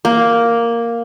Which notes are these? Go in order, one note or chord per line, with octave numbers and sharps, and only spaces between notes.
A#3